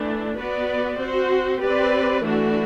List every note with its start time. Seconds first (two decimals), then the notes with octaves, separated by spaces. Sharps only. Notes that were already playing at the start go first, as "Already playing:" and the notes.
Already playing: E3 A3 D4
0.37 B3 F#4 B4 D5
0.99 C4 F#4 C5
1.60 C4 G4 B4 D5
2.22 E3 A3 D4 F#4